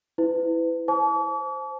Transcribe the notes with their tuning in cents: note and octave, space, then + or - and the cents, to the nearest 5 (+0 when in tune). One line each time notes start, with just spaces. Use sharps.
E4 +0 B4 +35
C5 +0 A5 -40 D6 -45